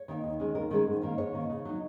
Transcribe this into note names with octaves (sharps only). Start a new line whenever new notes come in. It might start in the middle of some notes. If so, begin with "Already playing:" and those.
Already playing: C#5
D#3 A#3 D#4
D#2
D#3 G#3 C#4
D#2 A#4
D#3 G#3 C#4
G#2
D#3 A#3 C#4
G#2 C#5
D#3 A#3 C#4
C#3
F#3 D#4